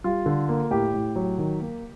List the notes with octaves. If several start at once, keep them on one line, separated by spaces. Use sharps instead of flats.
G3 F4
D3
A#3
A2 G4
A2
F#3
D#3
A#3